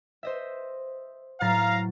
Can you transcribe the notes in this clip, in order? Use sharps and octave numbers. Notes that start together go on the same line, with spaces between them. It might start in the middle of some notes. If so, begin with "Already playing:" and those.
C5 D#5 E5
A2 F#3 F5 A#5 A6